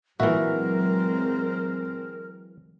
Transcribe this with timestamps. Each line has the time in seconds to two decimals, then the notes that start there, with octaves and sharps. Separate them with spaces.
0.20 A#2 E3 F#3 G#3 C4 F#4 A#4 E5